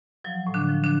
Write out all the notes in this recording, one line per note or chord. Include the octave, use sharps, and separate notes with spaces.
F3 F#3
A2
D3 D4
F3
D3 D4